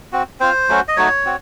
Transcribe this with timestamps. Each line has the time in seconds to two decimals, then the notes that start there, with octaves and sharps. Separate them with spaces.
0.12 C4 F#4
0.40 C4 F4 C5
0.69 F#3 A3 C#4 F#4
0.88 D#5
0.97 F#3 A3 D#4 F#4 C#5
1.26 C4 F#4